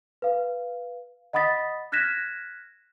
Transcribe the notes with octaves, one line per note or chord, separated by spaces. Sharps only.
B4 F5
D#5 F#5 B5 D#6 A6 B6
F6 F#6 G#6 A#6 B6 E7